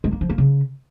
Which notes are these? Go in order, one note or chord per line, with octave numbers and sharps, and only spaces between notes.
G#3
A#3
F3
A#3
C#3